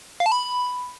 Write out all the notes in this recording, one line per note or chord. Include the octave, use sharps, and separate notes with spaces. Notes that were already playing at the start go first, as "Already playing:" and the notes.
F5
A5
B5